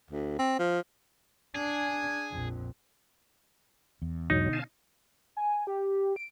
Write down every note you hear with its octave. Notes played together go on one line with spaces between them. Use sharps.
D2
C4
F3
D4 G#4 G#5
A#1 F2
E2
E2 G#2 B2 D3 F#3 D#4
F5 G#5 A5
G#5
G4
D7